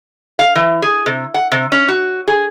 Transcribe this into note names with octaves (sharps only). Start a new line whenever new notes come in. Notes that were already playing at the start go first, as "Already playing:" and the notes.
F5
E3
G#4
C3
F#5
C3
C#4
F#4
G#4